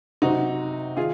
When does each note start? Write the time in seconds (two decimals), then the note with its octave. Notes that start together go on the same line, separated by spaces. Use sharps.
0.22 C3 F#3 C4 D#4 F#4
0.97 D#3 F4 G#4